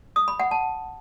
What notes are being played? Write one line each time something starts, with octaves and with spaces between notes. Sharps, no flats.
D#6
B5
F#5
A5